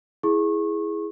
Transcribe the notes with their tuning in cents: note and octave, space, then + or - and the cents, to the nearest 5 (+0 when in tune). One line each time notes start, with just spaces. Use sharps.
E4 +0 G#4 +0 C#6 -25